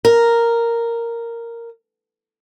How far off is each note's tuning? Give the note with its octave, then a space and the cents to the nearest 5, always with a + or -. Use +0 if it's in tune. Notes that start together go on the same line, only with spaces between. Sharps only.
A#4 -5